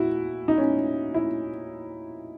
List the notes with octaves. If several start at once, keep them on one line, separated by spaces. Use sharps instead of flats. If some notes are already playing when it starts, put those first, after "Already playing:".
Already playing: A#2 E4 F#4
D#4
C#4
E4